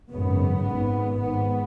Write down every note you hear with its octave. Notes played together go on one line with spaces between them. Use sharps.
G#1 F#2 C#3 B3
G#1 G#2
G#1 G#2 B3